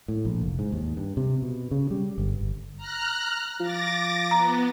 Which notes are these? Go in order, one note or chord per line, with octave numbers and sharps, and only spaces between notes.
A2
A#1
F1
G#2
D#2
G2
C3
B2
C#3
G3
G1
G1
A#5 F6 F#6
F3 D6 A6 A#6
B3 A#5